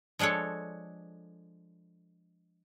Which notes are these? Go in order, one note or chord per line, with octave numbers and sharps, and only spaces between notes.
F3 G#3 D4 A4 C#5